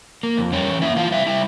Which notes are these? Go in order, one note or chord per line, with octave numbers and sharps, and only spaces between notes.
A#3
F2
G3 C#4 C#5
E3
A#3 E4 E5
E3 F4 F5
G3 E4 E5
G3 E4 E5